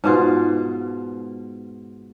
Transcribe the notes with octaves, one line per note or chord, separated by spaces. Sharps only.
G#2 B2 F4